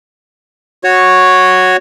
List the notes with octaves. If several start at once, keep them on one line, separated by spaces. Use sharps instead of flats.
F#4 C#5